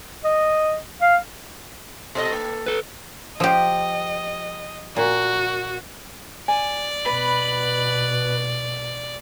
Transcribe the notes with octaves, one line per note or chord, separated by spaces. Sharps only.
D#5
F5
B2 A4 D5 D#5
A#3
A4 B4
F3 G4 D#5
A#2 F#4
D5 G#5
B2 B4 B5